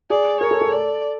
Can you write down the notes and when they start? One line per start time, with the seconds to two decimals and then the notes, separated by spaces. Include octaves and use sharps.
0.10 G#4 D5
0.40 A#4 C#5
0.51 A4
0.61 A4
0.72 D5